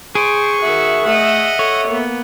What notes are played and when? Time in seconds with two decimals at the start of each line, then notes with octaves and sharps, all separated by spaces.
0.15 G#4 C5 C#6 D7
0.62 D#3 F#4 E5
1.07 A3 D#5 F#5
1.59 A4 C#5
1.88 A#3 B3